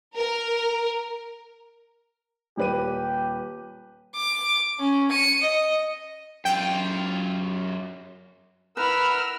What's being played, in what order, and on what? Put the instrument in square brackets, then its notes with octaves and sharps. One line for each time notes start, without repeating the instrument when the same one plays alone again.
[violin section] A#4
[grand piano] D#1 B4 D#7 [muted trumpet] G4
[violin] D6
C#4
C#7 D#7
D#5
[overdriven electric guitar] F#2 F4 [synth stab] G5
[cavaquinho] E4 B4 [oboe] A#4 [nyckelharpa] F#5 B5 [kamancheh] E6 F6